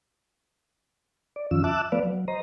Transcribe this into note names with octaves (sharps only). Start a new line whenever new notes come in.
D5
F2 D#3 F3 C#4 F4 E6
E5 A5 D6 E6 F#6
F3 A3 B3 B4 D5 F5
F#3
C5 D#5 A#5